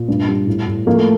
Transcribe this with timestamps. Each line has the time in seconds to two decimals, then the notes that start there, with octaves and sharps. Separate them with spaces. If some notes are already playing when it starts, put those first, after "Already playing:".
Already playing: A#2
0.08 G2
0.28 G3
0.47 A2
0.68 A2
0.86 F3 A#3
0.94 A3